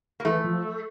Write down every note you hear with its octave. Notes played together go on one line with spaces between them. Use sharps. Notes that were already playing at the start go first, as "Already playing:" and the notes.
A#3
E3 A3
F3